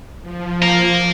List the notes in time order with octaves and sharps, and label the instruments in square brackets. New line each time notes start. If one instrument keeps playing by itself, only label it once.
[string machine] F3
[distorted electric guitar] F5 A#5